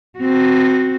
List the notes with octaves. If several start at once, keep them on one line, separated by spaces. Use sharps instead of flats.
C4 F#4